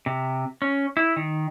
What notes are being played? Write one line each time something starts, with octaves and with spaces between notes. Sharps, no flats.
C3
C#4
E4
D#3